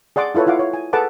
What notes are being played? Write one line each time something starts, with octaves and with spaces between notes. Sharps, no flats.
G#4 D5 F#5 C6 D6
E4 F4 A4 B4 C#5
E4 F4 F5 F#5 D6
C#5
G#5
G#4 A4 B4 F#5 A5 D6